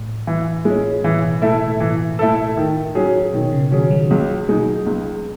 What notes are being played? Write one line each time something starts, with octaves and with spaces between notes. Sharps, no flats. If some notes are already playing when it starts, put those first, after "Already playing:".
Already playing: A2
E3
G#3 C#4
A2 E3
B2
B2 A3 E4 A4
B2
A2 E3
A3 E4 A4
D#3
F#3 C#4 G#4
B2 D#3
C#3
D#3 F#3 C#4 G#4
F#3
C#2 F#3
B2 G#3 D#4
C#2